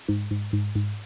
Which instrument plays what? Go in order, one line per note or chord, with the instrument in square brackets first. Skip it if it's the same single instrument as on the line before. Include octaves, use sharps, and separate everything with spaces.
[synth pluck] G#2
G#2
G#2
G#2